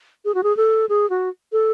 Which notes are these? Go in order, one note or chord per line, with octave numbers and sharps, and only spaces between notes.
G#4
F#4
G#4
A4
G#4
F#4
A4